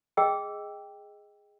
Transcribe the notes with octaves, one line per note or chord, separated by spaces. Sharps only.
G#4 D#5 G5 E6